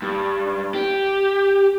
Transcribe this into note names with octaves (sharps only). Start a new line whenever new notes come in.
G2
G4